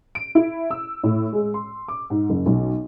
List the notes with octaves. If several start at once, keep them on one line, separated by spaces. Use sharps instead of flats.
D7
E4
E6
A2
G#3
C6
D6
G#2
F#1
B1